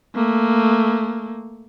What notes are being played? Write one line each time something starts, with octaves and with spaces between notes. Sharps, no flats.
A3 A#3